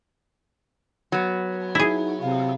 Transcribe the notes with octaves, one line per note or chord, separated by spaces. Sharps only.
F#3 B3
D#4 E4 G#4
C3 F5